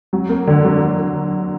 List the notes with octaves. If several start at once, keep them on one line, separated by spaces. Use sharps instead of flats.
F#3
A#3
D3
F#3
D3